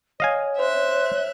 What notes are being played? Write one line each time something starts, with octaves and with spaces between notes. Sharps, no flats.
C#5 D#5 F5 G#5
C5 E5 F#6